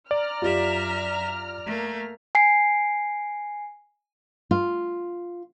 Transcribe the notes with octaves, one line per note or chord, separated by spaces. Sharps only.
D5 A#5 F6
F#2 F4 G4 E5
A3 A#3
G#5 C7
F4